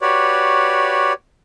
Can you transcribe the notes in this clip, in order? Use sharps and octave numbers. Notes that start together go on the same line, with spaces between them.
F#4 G4 B4 C#5 D5